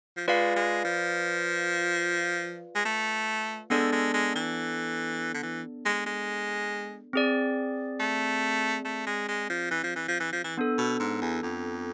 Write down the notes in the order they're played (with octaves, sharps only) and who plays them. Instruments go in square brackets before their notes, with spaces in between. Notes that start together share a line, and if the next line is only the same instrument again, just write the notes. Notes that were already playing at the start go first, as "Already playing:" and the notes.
[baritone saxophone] F3
[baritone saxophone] G#3 [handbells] F4 B4 D5 F5
[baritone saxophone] G#3
F3
G#3
A3
[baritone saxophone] G#3 [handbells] B3 D4 A4 D5
[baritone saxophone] G#3
G#3
E3
D3
E3
G#3
G#3
[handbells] C4 G#4 D5
[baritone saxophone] A3
A3
G#3
G#3
F3
E3
F3
E3
F3
E3
F3
E3
[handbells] B3 D4 A4
[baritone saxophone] B2
G#2
E2
F2